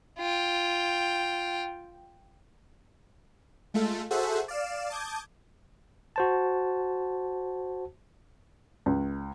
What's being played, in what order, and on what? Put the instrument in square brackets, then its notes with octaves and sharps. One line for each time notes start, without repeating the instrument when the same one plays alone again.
[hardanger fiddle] F4 G5
[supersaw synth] G#3 A3 F4 A4
F#4 G#4 A4 C5 E5 F#5
D5 F5 E7
A5 D6 D#6 G6 G#6
[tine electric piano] F#4 C5 A5
[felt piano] C#2